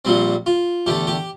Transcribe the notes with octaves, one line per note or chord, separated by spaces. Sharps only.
A#1 A#2 G3 C4
F4
E2 D3 A3 G4
G4